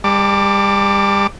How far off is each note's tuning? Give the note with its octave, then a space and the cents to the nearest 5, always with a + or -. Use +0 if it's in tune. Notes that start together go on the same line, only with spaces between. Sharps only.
G3 +35 A5 +30 D6 +0